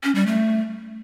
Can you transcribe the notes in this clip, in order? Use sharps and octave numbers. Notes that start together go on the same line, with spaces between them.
C#4
G3
A3